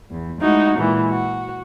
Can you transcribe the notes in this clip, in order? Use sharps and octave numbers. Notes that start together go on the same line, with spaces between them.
E2
G#3 A3 D#4 E4 F#4
A#2 E3 G#3
F#4